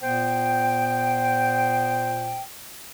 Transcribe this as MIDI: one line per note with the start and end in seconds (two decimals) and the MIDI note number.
0.01 2.41 46
0.01 2.41 59
0.01 2.41 72
0.01 2.41 79